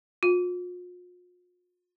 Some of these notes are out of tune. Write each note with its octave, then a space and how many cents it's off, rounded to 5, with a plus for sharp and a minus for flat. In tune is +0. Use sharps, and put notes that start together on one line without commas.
F4 +45